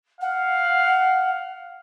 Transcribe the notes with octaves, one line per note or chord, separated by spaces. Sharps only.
F5 F#5